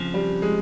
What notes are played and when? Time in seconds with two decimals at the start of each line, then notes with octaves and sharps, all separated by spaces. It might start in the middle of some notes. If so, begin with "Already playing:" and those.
Already playing: F2 C#3 F3
0.14 G3
0.42 G#3